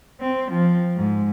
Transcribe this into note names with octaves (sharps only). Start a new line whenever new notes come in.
C4
F3
G#2